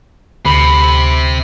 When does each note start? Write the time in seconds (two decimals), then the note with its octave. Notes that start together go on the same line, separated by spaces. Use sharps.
0.45 D2 C3 B5